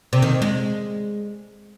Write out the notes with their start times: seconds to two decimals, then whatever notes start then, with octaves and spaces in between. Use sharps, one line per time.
0.13 C3
0.22 D#3
0.42 G#3